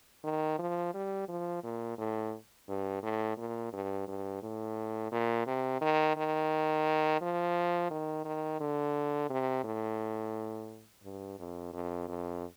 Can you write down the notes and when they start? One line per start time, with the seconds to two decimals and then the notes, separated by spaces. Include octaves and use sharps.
0.24 D#3
0.59 F3
0.94 G3
1.29 F3
1.64 A#2
1.98 A2
2.68 G2
3.03 A2
3.38 A#2
3.73 G2
4.08 G2
4.43 A2
5.12 A#2
5.47 C3
5.81 D#3
6.16 D#3
7.21 F3
7.91 D#3
8.25 D#3
8.60 D3
9.30 C3
9.64 A2
11.04 G2
11.39 F2
11.73 F2
12.08 F2